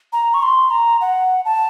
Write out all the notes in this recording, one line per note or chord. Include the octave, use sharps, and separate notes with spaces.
A#5
C#6
C6
A#5
F#5
A5